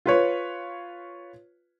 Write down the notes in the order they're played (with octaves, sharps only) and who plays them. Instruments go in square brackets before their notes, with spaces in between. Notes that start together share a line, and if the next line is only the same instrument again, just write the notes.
[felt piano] F4 B4 C#5